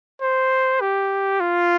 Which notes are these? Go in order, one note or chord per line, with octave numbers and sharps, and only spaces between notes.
C5
G4
F4